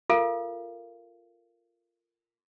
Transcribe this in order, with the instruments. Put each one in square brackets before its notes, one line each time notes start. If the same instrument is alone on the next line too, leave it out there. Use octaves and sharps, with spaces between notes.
[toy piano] F4 A4 A#4 F5